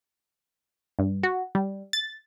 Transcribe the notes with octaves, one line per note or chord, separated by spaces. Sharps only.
G2
F#4
G3
A6